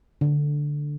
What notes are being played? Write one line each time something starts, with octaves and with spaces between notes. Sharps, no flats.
D3